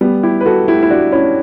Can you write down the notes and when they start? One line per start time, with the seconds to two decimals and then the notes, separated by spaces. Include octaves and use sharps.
0.01 G3 B3
0.23 E4 G4
0.41 B4
0.46 F#4 A4
0.68 E4 G4
0.83 E4
0.91 D4 F#4
1.12 C#4 E4